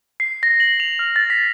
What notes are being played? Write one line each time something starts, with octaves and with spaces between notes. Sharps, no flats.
C7
A#6
F#7
F7
F6
A6
B6